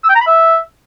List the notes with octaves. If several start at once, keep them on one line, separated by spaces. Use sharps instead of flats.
E6
G5
A#5
B5
E5